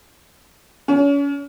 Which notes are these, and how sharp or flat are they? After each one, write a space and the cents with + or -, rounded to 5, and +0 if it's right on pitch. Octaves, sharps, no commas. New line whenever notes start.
C#4 +35